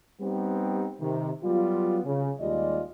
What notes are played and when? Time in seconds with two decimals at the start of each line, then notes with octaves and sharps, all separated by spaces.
0.21 G3 B3 C4 D#4 G4
1.00 C3 D#3
1.43 F#3 G3 B3 F4
2.05 C#3
2.40 D#2 G3 G#3 F4 D5 D#5